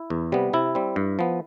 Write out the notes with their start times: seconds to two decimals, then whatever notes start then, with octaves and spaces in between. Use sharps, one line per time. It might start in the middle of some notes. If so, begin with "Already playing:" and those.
Already playing: E4
0.10 E2
0.32 C3 G3 B3
0.53 C3 E4
0.75 G3 C4
0.96 G2
1.19 F3 B3